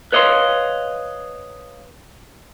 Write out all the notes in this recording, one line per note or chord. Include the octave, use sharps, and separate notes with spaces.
B4 C#5 D#5 F5 C6